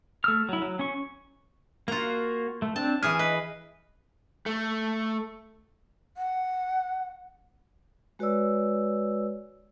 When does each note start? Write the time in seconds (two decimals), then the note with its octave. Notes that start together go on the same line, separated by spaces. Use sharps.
0.24 A3 E6 F6
0.49 F#3 E4
0.62 F#3
0.79 C#4 C#6
1.88 A#3 F4 F#4 A#5
2.62 A3
2.76 C4 D4 A5
3.03 E3 G#4 G#5 F6
3.19 B4 D#5
4.46 A3
6.17 F#5
8.19 G#3 F#4 B4 C#5 D5 E6